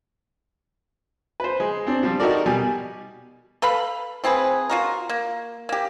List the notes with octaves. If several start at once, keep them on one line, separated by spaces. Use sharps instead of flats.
B4 C5
G#3
C4 D4
F3 G3
D#4 F#4 G4 A4 A#4 D5
B2 G3 G#5
A4 B4 F5 B5
F3 C4 G#4 B4
F4 F#4 A#4
A#3
A#3 G4